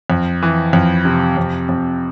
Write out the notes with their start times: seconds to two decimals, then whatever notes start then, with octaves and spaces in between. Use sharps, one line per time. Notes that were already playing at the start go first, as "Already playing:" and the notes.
0.10 F2
0.43 E3
0.73 F2
1.05 C3
1.37 F2
1.69 F2